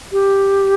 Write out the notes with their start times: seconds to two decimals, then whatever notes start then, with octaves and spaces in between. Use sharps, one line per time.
0.12 G4